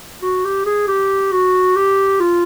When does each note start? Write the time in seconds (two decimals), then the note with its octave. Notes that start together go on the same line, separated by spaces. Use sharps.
0.22 F#4
0.45 G4
0.66 G#4
0.88 G4
1.32 F#4
1.76 G4
2.20 F4